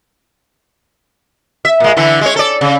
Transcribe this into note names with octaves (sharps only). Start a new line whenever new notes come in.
E5
A#2 G#3
D3 E3 E4
G#3 C#5
A4 D5
C#3